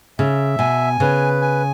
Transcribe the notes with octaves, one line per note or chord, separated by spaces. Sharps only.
C#3 E5
B2 G#5
C#3 B4
G#5